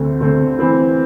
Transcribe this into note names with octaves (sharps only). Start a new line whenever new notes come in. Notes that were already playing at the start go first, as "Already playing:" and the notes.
Already playing: D2 D3 A3 C4
D2 D3 A3 C4
E3 C4 E4